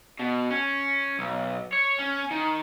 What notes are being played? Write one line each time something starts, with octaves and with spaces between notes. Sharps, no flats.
B2
C#4
B1
C#5
C#4
D#3